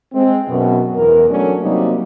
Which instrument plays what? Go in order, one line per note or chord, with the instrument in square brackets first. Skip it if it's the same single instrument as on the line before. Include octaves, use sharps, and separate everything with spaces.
[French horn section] G#3 C4
F#2 B2
E2 A#4
F#3 A3 C#4 D4
C3 F#3 G3 A#3 D#4